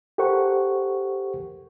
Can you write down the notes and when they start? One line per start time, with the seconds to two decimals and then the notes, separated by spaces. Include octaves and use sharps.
0.18 G4 A4 A#4 C5 F#5 C#6